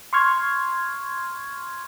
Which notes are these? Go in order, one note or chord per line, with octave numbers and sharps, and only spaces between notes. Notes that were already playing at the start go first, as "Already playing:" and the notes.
C6 C#6 F6 G#6